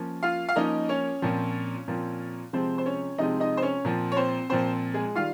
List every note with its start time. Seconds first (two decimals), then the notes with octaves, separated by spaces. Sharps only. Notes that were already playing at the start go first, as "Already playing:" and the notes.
Already playing: F3 A#3 C#4
0.23 F4 F5
0.49 F5
0.56 F3 A#3 C#4 D#4 D#5
0.89 C#4 C#5
1.22 A#2 F3 C4
1.88 A#2 F3 C4
2.53 C3 F3 G#3 C4 C5
2.78 C5
2.86 C#4 C#5
3.18 C3 F3 G#3 C4 D#4 D#5
3.40 D#4 D#5
3.57 C5
3.62 C#4 C#5
3.85 A#2 F3 C4
4.12 C#5
4.17 C4 C5
4.50 A#2 F3 C4 C5
4.94 G#3 G#4
5.15 D#3 G3 F4 F5